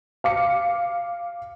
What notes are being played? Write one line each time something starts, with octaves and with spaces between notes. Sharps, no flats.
F5 D6 C#7